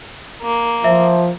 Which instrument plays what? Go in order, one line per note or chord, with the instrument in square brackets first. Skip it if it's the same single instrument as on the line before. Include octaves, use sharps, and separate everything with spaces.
[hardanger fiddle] A#3
[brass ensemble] F3 [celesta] E5